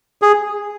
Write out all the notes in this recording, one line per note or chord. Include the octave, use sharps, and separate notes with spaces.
G#4